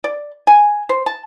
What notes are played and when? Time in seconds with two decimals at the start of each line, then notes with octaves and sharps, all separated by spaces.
0.04 D5
0.47 G#5
0.89 C5
1.06 A5